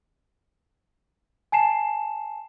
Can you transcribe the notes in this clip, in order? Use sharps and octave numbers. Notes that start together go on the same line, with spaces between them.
G#5 A5 C7 E7